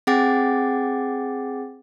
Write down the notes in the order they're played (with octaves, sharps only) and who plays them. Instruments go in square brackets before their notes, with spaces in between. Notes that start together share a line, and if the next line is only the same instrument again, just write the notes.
[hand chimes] C4 G#4 F#5 G5 D6 A6